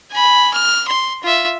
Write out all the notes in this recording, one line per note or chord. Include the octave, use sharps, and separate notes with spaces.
G#5 B5
F6
C6
F4 E5